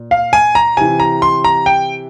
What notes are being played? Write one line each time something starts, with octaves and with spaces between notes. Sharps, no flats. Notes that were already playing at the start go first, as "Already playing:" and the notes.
Already playing: A#2
F5
G#5
A#5
C3 E3 G#5
A#5
C6
A#5
G5